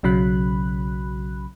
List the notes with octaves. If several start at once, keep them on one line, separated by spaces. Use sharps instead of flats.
B1 C#3 F#3 B5 F#6